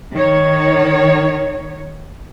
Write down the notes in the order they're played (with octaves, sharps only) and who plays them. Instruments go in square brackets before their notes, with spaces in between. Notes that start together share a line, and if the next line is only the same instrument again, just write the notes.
[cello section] D#3 C#5